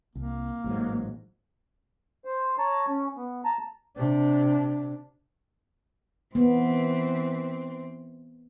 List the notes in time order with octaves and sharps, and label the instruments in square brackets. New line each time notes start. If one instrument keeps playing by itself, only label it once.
[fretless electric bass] C2 [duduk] A#3
[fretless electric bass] A1 G#2 F#3
[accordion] C5
C#5 A5 A#5
C#4
B3
A5 A#5
[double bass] C3 D4
[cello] E3 C4 [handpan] B3